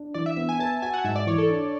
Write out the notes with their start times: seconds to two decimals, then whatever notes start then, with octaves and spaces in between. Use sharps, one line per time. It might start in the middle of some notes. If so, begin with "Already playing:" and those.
Already playing: D4
0.14 E3 D5
0.26 E5
0.37 B3 E5
0.49 G#5
0.59 B4 A5
0.82 F#4 G#5
0.94 F#5
1.04 G#2 E5
1.15 D5
1.27 E3 C#5
1.38 A4
1.49 D4